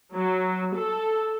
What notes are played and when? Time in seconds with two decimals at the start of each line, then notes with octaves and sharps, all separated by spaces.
0.14 F#3
0.75 A4